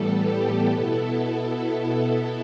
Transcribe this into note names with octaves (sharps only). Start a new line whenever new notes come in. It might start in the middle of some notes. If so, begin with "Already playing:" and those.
Already playing: A2 E3 G3 B3 A4
G4
B2 B3 E4 A4